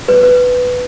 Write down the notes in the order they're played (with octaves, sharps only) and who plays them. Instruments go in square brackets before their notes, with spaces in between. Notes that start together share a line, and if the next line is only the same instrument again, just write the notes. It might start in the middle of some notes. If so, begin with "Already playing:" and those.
[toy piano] B4
B4